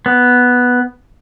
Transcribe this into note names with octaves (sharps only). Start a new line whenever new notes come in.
B3